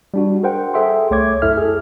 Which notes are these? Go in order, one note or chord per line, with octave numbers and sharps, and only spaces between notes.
G3 D4 F#4
G#4 A#4 C5 F#5 G5
G#4 A4 E5 G5 C6
C2 A3 C#5 D6 G#6
F#2 E4 A4 E5 F6
G#4 A4